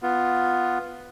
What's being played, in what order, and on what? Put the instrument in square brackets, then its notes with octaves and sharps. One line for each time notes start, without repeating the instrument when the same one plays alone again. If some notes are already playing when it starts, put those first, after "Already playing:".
[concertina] B3 F4